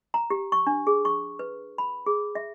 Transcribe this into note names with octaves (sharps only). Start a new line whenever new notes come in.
A#5
G4
C#6
D4
G#4
C#6
B4
B5
G#4
E5